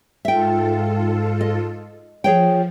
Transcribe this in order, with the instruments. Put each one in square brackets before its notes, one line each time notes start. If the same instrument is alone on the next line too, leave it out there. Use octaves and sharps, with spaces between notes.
[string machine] G#2 F4 A4 [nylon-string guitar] E5 G5
[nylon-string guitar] D#5
[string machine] F3 [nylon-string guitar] G#4 C#5 G5